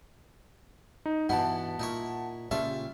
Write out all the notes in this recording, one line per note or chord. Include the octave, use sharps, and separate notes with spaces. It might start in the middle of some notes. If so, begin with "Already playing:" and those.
D#4
G2 B2 E3 B3 E4 F#5 A5
A#2 D#4 E4 C#5
A#2 C#3 G3 F4 C#5 E5 A5